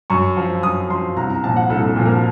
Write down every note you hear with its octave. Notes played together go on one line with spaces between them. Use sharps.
F#2 C#6
F3
F#2 D#6
F3 C6
C2 A#5
A#5
A#2 F3 A5
F#5
C2 A4
A4
A#2 F3
A#4